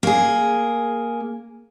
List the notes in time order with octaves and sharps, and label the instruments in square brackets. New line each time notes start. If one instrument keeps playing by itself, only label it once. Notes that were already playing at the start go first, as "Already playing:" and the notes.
[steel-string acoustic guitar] A#3 G#4